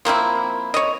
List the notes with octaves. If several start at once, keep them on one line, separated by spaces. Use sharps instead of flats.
F3 A#3 C4 E4
C#5 D#5